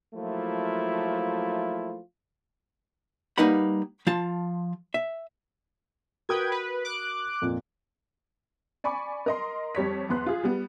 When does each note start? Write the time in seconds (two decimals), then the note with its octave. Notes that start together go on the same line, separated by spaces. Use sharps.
0.15 F3 F#3 A3 A#3 E4 F4
3.38 G3 A#3 D#4 B4 F#5 B5
4.07 F3 F4 A5
4.94 E5
6.29 F#4 A#4 B4 G5 D#6 G#6
6.52 B4
6.85 D6 F#6
7.42 F2 A#2
8.84 D5 G#5 B5 C#6 D6
9.26 A#4 D#5 C6
9.75 F2 G3 C#5 B6
10.09 E2 B3 C6 F#6
10.26 F4 G#4
10.43 G3 B3